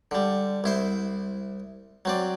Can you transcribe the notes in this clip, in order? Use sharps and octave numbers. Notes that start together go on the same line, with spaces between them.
D3 G3
C2 E4 C5
F#3 C4 D5